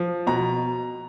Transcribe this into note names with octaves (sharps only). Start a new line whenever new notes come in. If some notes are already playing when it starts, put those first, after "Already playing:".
Already playing: F3
B2 A#5